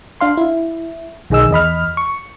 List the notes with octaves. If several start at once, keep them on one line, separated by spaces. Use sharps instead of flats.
D4 F5 C6
E4
B1 D#3 G#4 D#5 E6
E2 D#5 B5 F6
C#6